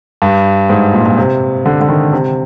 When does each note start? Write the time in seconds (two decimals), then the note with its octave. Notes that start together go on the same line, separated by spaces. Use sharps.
0.22 G2
0.69 G#2
0.94 A#2
1.05 A#2
1.18 C3
1.65 D3
1.81 D3
1.89 D#3
2.13 C3